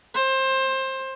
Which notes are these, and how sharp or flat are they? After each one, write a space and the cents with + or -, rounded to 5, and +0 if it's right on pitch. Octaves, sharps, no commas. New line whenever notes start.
C5 +20